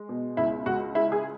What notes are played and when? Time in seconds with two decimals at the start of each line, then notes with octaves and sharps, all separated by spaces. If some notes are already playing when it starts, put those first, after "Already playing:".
Already playing: G#3
0.09 B2
0.37 C#2 E4
0.66 C#2 F#4
0.95 G#3 E4
1.12 G#4